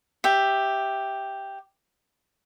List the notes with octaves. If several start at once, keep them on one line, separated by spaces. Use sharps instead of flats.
G4 E5